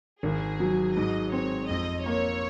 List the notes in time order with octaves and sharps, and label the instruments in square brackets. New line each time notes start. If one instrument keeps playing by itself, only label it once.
[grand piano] G#1 [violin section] G#4
[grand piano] F#3
[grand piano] G#2 [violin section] D#5
[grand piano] C4 [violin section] C#5
[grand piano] F2 [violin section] D#5
[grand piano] A#3 [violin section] C#5